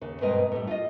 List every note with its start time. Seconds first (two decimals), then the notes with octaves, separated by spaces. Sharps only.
0.01 D#2 C#3
0.21 G2 B2 G#3 C4 A#4 D#5
0.52 A2 G3
0.67 F4 D#5